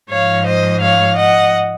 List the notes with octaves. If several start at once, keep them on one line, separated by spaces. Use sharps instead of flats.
G#2 F3 C#5 F5
C5 D#5
C#5 F5
D#5 F#5